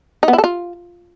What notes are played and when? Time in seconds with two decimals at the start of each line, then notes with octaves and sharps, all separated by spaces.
0.23 D#4
0.28 B3
0.33 E4
0.38 A4
0.44 F4